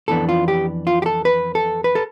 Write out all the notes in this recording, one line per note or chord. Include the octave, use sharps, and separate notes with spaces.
F2 E3 B3 D4 A4
F4
G4
F4
G4
A4
B4
A4
B4
A4